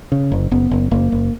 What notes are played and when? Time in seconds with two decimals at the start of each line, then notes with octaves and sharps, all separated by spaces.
0.12 C#3
0.32 F#1
0.51 F#1 B3
0.71 F#1
0.91 F#1 A#3
1.12 F#1